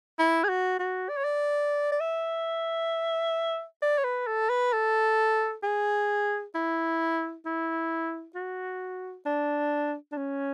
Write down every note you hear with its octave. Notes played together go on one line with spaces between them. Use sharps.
E4
G#4
F#4
F#4
D5
C#5
D5
D5
E5
D5
C#5
B4
A4
B4
A4
G#4
E4
E4
F#4
D4
D4
C#4